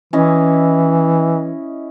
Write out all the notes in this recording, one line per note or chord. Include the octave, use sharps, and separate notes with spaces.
E3 C#4 E4 D#5